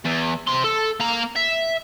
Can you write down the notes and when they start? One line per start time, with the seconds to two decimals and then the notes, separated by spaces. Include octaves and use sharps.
0.05 E2
0.47 C3 C6
0.64 A4
1.00 A#3 A#5
1.36 E5